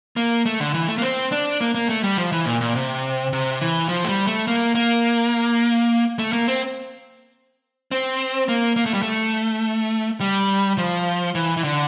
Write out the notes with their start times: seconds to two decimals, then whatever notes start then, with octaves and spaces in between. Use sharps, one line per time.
0.16 A#3
0.46 A3
0.60 D3
0.74 E3
0.88 A3
0.98 A#3
1.02 C4
1.32 D4
1.61 A#3
1.74 A#3
1.89 A3
2.03 G3
2.17 F3
2.32 E3
2.46 A#2
2.61 A#2
2.75 C3
3.33 C3
3.61 E3
3.89 F3
4.04 A3
4.09 G3
4.27 A3
4.47 A#3
4.75 A#3
6.19 A3
6.33 A#3
6.48 C4
7.91 C4
8.48 A#3
8.76 A#3
8.86 A3
8.94 G3
9.02 A3
10.20 G3
10.78 F3
11.35 E3
11.57 E3
11.64 D3